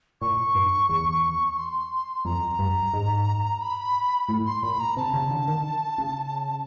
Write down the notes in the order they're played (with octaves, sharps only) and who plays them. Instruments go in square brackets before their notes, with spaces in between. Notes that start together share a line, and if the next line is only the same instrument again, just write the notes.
[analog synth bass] A#2 [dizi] C#6
[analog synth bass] G2
E2
[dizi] C6
[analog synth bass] F2 [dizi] A#5
[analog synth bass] G2
G#2
[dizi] B5
[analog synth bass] A2
[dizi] C6
[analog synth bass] A#2 [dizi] B5
[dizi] A#5
[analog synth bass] C3 [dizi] A5
[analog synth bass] C#3
D3
D#3
C#3